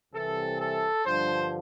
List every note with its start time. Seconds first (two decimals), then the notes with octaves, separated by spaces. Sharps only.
0.14 C2 C3 E3 A4
0.59 A4
1.05 G2 D3 F3 C5